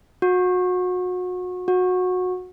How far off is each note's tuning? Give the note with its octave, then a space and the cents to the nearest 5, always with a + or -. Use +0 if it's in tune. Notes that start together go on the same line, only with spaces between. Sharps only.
F#4 -30
F#4 -20